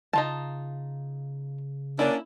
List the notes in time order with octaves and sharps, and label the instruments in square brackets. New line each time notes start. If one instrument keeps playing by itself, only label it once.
[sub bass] C#3 [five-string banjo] D#4 F4 A5
[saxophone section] A#3 C#4 D4 [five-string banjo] E4